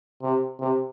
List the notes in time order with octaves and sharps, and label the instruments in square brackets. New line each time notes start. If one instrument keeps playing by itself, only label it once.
[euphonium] C3
C3